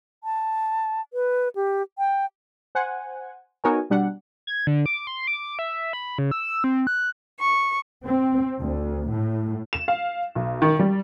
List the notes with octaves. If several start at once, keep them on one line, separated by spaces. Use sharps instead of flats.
A5
B4
G4
G5
C5 F#5 G#5
B3 D#4 F#4 A#4 C#5 G#5
B2 G3 D4 F#5
G#6
D3
D6
C6
D6
E5
B5
C#3
E6
C4
F#6
C#6
C4
D2
A2
E7
F5
B1
D#3
G3